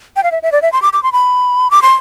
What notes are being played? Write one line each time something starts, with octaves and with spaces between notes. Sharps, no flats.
G5
F5
E5
E5
D5
E5
C6
D6
D6
C6
B5
D6
C6